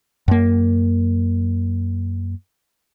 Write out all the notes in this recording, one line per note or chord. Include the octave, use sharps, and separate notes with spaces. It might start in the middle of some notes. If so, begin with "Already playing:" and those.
F#2 A#3